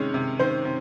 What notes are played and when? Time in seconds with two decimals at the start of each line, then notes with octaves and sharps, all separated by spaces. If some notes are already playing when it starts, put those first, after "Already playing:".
Already playing: C3 D#3 G#3 C#4 C#5
0.14 C3
0.39 D#3 C4 C5
0.65 C3